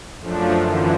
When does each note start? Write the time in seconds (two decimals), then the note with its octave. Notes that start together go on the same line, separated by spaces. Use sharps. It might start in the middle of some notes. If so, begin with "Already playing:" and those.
0.19 F#2 F3 A3 D4
0.62 F#2 D3 E3 F3